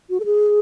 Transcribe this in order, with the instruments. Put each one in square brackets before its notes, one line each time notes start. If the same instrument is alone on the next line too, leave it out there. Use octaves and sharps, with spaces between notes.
[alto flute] F#4
A4
G#4